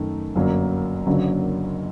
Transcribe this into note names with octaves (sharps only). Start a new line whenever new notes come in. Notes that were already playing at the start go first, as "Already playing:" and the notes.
Already playing: F#2 D#3 A3
G1 F#2 F#3 A#3
F#1 F#2 D3 F#3 A#3